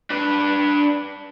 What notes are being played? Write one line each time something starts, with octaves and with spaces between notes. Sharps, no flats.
D4 B4